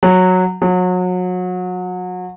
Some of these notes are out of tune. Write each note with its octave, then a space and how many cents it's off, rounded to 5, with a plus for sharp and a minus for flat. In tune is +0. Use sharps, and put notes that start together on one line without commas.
F#3 -10
F#3 -30